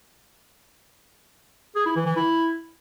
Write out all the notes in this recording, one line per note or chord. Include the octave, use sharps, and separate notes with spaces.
G#4
E4
E3
E3
E4